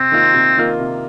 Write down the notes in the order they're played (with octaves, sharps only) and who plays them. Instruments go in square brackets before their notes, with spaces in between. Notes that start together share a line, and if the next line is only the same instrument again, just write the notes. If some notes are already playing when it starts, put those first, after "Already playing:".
Already playing: [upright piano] C3 [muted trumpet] C4
[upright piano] D#3 A#3 F4 A#4
C3
D#3 A#3 F4 A#4
C3